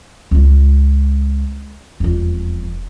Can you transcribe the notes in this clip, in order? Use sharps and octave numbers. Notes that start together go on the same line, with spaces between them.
C#2 G#3
E1 F2